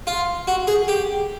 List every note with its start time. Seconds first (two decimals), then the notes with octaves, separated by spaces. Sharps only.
0.07 F4
0.48 F#4
0.67 G#4
0.88 G4